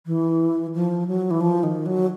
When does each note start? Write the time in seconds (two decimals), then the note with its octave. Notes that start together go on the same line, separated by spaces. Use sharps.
0.06 E3
0.74 F3
1.08 F#3
1.31 E3
1.41 F3
1.63 D#3
1.86 F#3